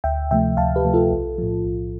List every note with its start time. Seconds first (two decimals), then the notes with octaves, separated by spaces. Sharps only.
0.04 D2 E5 G5
0.31 C3 F3 A3 E5 G5
0.57 D2 F5 A5
0.76 G4 B4
0.85 C3 F3 A3
0.94 F4 A4
1.12 B1
1.38 A2 F3
1.65 B1